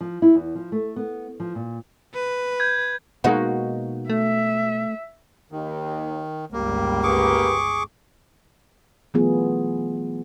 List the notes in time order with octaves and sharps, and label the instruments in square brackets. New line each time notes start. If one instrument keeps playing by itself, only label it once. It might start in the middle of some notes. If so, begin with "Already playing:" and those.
[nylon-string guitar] F3
E4
E2
F3
A3
B3
F3
A#2
[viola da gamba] B4
[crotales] G6 G#6
[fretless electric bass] B2 G#3 A#3 [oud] D#4 F#4
[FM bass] A3 [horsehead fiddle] E5
[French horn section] D#2 [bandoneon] D#3
[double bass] G1 C#2 [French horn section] G3 [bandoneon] A#3
[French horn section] G4 A#4 B4 [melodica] G#4 C#6 D6
[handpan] E3 F#3 A3 B3 F4 G#4